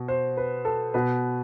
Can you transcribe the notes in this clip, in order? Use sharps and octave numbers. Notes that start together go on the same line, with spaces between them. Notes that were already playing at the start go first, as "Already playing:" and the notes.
Already playing: B2
C5
B4
A4
B2 B4